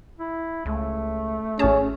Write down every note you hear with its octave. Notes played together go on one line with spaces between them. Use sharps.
E4
C#2 A3
A1 C#4 G#4 A5